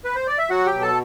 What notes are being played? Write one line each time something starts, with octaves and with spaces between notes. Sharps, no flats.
B4
C5
D5
E5
F#3 F#4 F#5
G4 G5
B2
A4 A5